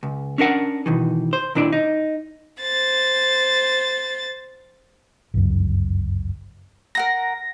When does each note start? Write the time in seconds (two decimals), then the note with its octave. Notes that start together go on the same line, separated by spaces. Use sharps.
0.03 C#2
0.38 C#4 D4 A#4 F#5
0.86 B2 D#3 E3
1.33 C5
1.55 D#2 A#2 D4 E4 D5
1.72 D#4
2.62 C5 A6
5.34 G1 C#2 F#2
6.95 A#4 F#5 A#5 A#6